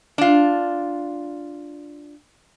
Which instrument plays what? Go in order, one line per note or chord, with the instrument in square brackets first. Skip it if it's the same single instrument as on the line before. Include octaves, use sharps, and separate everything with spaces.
[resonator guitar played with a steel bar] D4 F4